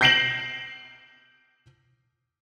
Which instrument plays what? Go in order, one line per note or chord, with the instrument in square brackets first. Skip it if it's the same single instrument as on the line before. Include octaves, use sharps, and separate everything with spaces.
[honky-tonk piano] G6 A#6 C7 D7 E7 F#7